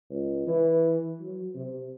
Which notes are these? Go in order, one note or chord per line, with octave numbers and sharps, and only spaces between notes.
C#2
E3
F#3
C3